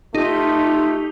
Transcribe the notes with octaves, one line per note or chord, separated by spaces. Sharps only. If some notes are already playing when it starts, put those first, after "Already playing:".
A3 D#4 F4 G4